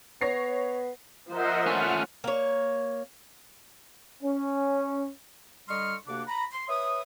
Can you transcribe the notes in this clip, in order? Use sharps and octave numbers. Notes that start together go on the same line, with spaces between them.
B3 C#5 A#6 C7
F3 A#4 C5 D#5 E5 F#5
A3 C#4 F#5 F6
A#3 C#5
C#4
D3 G3 D#5 C6 C#6 F6
D2 C3 A#3 D4 F#5 D6
A#5 B5
C6
B4 C#5 E5 D#6